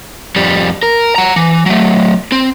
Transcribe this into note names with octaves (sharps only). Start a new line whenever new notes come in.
F2 G3
A#4
F#5 A#5
E3
F#3 A3
C4